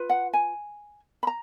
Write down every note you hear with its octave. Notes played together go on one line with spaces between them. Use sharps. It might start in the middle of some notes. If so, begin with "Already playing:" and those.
Already playing: F4 B4
F#5
G#5
B5
A#5